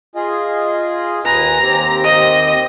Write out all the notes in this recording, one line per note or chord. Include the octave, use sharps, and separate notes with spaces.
F4 G#4 D#5
D#2 B4 G#5 A#5
D#2 C4 G4
D#5